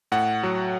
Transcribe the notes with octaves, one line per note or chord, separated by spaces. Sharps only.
A2 F#5
F#3